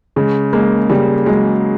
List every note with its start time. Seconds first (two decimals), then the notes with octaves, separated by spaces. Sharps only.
0.16 C#3 G#3
0.53 G#3 A#3
0.89 C#3 G3
1.26 F#3 G#3